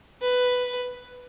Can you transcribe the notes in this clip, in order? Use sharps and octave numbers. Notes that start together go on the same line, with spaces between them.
B4